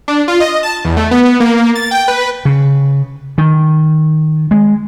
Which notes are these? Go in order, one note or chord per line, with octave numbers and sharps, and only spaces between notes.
D4
F4
D#5
A5
E2
A3
B3
A#3
A6
G5
B4
C#3
D#3
G#3